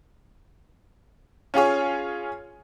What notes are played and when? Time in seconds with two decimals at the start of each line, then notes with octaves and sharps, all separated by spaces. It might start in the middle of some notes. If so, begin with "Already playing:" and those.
1.54 C#4 F4 G#4 C#5